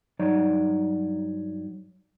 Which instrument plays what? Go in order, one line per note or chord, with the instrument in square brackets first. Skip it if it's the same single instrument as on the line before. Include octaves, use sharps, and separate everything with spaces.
[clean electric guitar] G2 F#3 D#4 C#5 D5